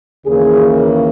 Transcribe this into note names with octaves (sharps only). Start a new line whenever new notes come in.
D#2 C#3 E3 A#3 G#4